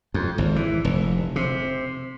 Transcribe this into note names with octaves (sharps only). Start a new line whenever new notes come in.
F2
G#1
E3
F1
C3